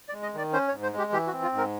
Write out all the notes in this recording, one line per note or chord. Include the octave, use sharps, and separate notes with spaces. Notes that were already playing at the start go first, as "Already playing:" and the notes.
D5
G#3
D#5
D#3 D5
C#4 C5
C#5
G#2
C5
G#3
G4
E3 G4
F#4
C4
F4
G#2
A#4